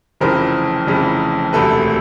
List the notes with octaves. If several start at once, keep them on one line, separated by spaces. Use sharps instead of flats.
F1 F2 C#3 E3 A#4 C5
F1 F2 C#3 E3
E1 D2 C3 A4 B4